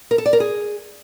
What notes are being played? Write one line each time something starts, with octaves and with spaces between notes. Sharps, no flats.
A#4
A4
D5
A#4
G#4